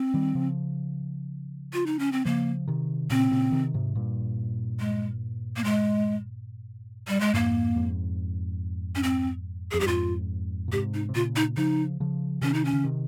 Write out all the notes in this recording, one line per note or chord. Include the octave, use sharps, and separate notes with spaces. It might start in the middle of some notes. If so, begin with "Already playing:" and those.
Already playing: C4
D#3 G3
C#3 F3
F4
D#4
C#4
C4
C#3 F3 A#3
C3 D#3
A#2 C#3 C4
A#2 C#3
C3 D#3
G#2 C3
G2 A#2
G#3
A#3
G#3
G3
G#3
F2 G#2 A#3
F2 G#2
C#4
C4
F2 G#4
G2 G4
F2 G#2 F4
A#2
G#2 C3 G4
D#4
C3
A#2 C#3 F4
D#4
C#3 F3 D#4
C#3 F3
C3 D#3 C#4
D#4
C#4
C#3
C3 D#3